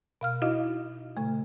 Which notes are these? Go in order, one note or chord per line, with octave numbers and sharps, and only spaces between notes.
B2 F5 F6
D#4 E4 F#4 D#5 F5
A#2 C#3 A3